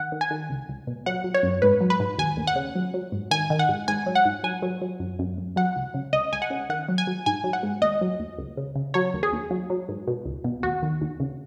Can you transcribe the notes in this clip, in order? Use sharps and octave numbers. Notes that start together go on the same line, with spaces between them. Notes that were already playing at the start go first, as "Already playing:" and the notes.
Already playing: D#3 F#5
D#3
G#5
D#3
C#2
C#2
B2
F#3 F#5
F#3
C#5
F#2
G#2 B4
F#3
B4
G#2
D#2 G#5
D#2
F#5
C#3
F#3
F#3
G#2
D#3 G#5
D#3
F#5
G#2
G#2 G#5
F#3
F#5
G#2
F#3 G#5
F#3
F#3
F#2
F#2
F#2
F#3 F#5
C#2
C#3
C#2 D#5
C#2 G#5
F#5
C#3
D#3 F#5
F#3
G#5
F#3
G#2 G#5
F#3
F#5
G#2
D#2 D#5
F#3
D#2
C#2
C#3
C#3
F#3 C#5
D#2
G#4
D#2
F#3
F#3
G#2
B2
C#2
B2
D#2 F#4
D#3
D#2
C#3